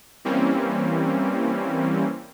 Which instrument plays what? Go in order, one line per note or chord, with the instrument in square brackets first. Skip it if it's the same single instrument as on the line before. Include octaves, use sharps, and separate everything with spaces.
[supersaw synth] E3 G3 A#3 C4 C#4